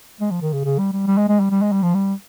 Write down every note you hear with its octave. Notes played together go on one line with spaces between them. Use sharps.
G#3
F3
D#3
C#3
C#3
G3
G3
G3
G#3
G#3
G3
G3
G#3
G3
F3
G3